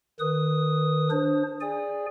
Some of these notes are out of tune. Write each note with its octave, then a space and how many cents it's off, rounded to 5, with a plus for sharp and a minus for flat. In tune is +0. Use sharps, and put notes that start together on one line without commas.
D#3 -20 B4 +0 D#6 +0
D4 +0 C5 +25
G#4 -5 D5 +0 G#5 -30